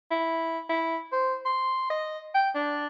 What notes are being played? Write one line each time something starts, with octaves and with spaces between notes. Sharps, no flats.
E4
E4
C5
C6
D#5
G5
D4